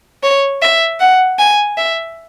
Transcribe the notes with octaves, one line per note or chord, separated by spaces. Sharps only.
C#5
E5
F#5
G#5
E5